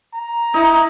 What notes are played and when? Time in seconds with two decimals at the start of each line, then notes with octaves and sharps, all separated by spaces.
0.14 A#5
0.54 D#4 E4